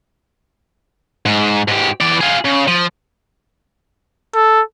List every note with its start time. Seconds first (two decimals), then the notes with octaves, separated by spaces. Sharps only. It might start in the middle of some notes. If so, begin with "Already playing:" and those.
1.26 G#2
1.68 G#2 G4
2.00 E3 D5
2.21 F4 G#4
2.45 C#3
2.68 F3
4.35 A4